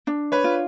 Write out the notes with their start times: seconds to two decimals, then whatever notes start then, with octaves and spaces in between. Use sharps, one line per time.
0.07 D4
0.32 B4 C#5
0.44 F4